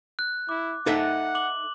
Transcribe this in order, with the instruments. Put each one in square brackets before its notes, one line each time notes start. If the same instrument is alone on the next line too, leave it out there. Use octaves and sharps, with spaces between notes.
[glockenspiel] F#6
[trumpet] E4 [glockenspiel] D6
[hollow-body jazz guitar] D#4 A4 E5 [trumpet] F#5
[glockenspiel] D6 F#7